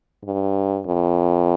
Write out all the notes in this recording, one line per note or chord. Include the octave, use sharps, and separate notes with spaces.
G2
F2